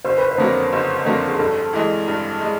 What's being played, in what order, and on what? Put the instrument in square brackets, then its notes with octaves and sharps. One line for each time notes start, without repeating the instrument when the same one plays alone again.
[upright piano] F#1 [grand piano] C5
[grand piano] B4
C5
[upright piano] F2 D3 F#3 A#3
F#1
F2 D3 F#3 A#3
[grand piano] G#4
[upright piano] G2 [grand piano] A4
[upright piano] E3 G#3
G2
G#3